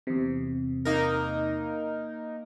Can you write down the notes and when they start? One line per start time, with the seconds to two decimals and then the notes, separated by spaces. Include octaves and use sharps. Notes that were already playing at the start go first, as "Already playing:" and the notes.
0.07 E2 C3
0.85 A#3 D#4 A#4